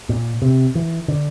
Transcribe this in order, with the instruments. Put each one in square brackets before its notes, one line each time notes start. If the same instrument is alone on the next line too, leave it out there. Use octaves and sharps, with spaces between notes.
[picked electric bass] A#2
C3
E3
D3